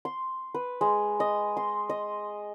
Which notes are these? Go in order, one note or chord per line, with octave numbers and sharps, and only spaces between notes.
C6
B4
G#3
D#5
C6
D#5